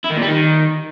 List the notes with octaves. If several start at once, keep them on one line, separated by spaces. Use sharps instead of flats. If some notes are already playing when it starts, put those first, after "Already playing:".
E4
D#3
A#2
G3
D#3